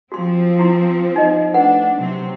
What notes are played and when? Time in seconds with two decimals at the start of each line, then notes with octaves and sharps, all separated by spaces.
0.12 F3 C4 F#4 C6
0.59 E4 C6
1.16 D#4 D#5
1.54 A3 D4 B4 F#5
1.97 C3 F#3 C4